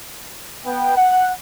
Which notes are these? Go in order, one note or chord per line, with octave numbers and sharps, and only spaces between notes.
B3 G5
F#5